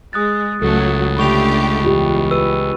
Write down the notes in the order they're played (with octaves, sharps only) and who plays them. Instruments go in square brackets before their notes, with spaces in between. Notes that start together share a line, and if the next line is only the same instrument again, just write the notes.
[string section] G#3 [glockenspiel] D#6 F#6 A6
[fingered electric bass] C#2 [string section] F#3 A3 [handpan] A4
[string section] D3 A3 G4 [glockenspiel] B5 C#6 F7
[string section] E2 [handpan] F4 G4
[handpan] B4 [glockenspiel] E6 D#7